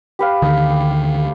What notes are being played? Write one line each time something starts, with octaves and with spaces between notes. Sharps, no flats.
G4 B4 F5
D2 D3 D#3 D#6